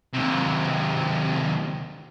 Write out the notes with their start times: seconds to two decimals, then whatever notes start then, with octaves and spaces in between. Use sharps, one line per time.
0.14 D#2 C3